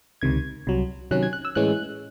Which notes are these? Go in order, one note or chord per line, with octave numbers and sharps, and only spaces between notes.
C#2 C3 D#3 G#6
C2 C3 F#3
C3 D#3 F#3 C#4 F#6
G#6
F#6
E6
A2 E3 G#3 C#4 F#6